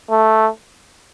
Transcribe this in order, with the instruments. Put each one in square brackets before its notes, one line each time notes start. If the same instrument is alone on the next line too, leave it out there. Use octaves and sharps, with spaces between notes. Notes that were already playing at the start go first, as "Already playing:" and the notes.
[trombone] A3